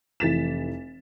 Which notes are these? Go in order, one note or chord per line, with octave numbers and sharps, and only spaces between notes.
F1 E3 A6 B6 E7